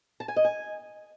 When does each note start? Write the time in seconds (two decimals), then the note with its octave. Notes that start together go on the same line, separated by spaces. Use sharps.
0.20 A5
0.28 G#5
0.36 D#5
0.45 G#5